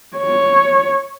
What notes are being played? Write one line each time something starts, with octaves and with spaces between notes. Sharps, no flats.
C#5